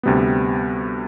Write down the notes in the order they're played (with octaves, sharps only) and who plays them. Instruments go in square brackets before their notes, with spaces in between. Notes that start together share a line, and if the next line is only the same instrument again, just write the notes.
[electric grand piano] D2 C3 G3 B3